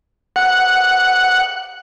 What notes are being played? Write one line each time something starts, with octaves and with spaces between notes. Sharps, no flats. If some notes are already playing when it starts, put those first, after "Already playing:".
F#5